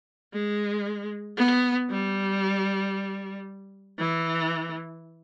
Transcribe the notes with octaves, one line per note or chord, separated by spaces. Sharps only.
G#3
B3
G3
E3